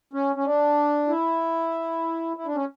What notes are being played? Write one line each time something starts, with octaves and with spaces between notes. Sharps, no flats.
C#4
C#4
D4
E4
E4
D4
C#4